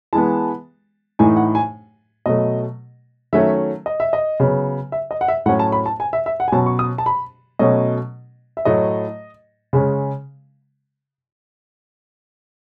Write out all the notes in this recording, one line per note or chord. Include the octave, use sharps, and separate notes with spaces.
E3 G#3 B3 A5
A2 E3 A3 D#4 G#5
F#5
G#5
B2 F#3 A3 D#5
D#3 F#3 A3 C#4 E5
D#5
E5
D#5
C#3 F#3 B3
E5
D#5
F#5
E5
A2 F#3 C#4 F#5
A5
B5
A5
G#5
E5
E5
F#5
G#5
B2 F#3 C#4 A5
C#6
D#6
A5
B5
B2 F#3 A3 C#4 D#5
E5
A2 F#3 A3 D#5
C#3 G#3 C#4